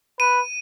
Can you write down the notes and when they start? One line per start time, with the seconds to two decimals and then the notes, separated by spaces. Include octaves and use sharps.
0.19 B4 D#7